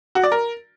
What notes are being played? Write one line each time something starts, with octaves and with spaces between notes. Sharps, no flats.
F#4
D5
A#4